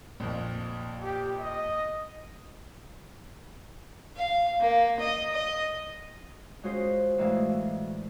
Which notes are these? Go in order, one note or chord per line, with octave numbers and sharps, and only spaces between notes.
A#1 F2
G4
D#5
F5
A#3
D#5
D#5
G#3 C#4 F4 F#4 G#4 C5
D2 A2 E3 G#3 A3 F5